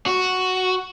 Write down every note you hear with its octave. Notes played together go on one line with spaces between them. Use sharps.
F#4